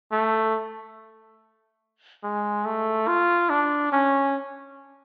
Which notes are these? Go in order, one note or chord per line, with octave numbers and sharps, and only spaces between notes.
A3
G#3
A3
F4
D4
C#4